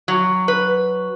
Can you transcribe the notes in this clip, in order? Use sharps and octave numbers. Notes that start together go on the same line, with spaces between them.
F#3
B4